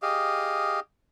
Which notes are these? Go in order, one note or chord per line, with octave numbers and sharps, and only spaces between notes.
G4 G#4 D#5 F5